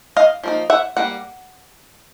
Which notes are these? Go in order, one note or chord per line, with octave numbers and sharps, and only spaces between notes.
D#5 F5
F3 A#3 D#4
E5 F#5
G3 A#3 F#5